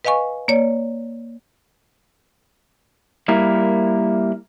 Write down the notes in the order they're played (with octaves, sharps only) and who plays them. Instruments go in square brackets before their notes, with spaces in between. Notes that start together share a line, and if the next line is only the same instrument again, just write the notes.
[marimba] B4 D#5 F5 G#5 C#6
A#3 C#5 D5
[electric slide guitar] G3 A#3 E4 A#4